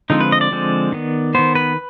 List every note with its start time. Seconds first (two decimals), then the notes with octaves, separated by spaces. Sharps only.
0.10 D3 F3 G#3 C4 D#4
0.21 B4
0.32 D#5
0.41 D5
0.51 D3 F3 G#3 C4
0.92 D#3 B3
1.35 D#3 B3 C5
1.55 B4